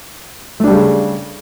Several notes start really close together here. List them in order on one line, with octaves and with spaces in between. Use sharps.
A3 D4 G3 C#3